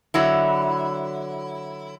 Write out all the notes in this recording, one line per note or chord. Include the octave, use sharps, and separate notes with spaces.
D3 F#3 E4